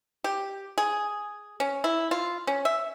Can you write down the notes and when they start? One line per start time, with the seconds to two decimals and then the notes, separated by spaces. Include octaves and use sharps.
0.24 G4
0.78 G#4
1.60 C#4
1.84 E4
2.11 F4
2.47 C#4
2.65 E5